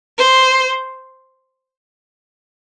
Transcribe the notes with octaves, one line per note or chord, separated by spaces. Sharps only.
C5